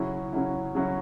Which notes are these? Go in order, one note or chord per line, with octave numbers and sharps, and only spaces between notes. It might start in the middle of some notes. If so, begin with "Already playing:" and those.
Already playing: C#3 F#3 C#4 E4
C#3 F#3 C#4 E4
C#3 F#3 C#4 E4